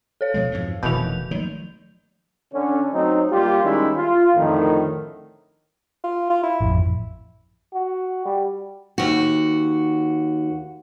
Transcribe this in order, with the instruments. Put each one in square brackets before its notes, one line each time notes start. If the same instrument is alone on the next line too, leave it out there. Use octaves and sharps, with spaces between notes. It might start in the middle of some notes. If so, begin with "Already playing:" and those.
[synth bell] A4 C#5 F5
[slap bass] B2 F3 G#3
F2 G#2 B2
[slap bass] F1 D#3 [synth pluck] B2 E3 [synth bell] G6 F7
[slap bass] D#3 [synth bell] F3 F#3
[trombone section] D3 C#4
F#3 A3 C4 D#4
G3 A#3 F4 G4
D#3 G3 G#3 C#4 D#4 E4
F4
F2 A2 D3 D#3
[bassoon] F4
F4
E4
[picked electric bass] A1 F2
[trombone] F#4
G3
[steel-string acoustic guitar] D#2 F#4